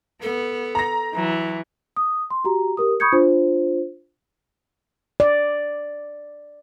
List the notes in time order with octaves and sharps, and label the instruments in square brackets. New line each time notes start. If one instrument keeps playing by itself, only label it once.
[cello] B3 [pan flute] A4
[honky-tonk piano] A#5 A#6
[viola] E3 [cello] F#3
[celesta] D#6
C6
F#4 G4 A#5
G4 A#4 D#6
B5 C#6 D#6 G6 G#6 C#7
D4 F4 C5
[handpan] D5